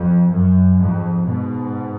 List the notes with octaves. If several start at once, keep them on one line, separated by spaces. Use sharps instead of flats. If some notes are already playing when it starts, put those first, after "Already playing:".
Already playing: F2
F#2
F2 G#2
G#2 B2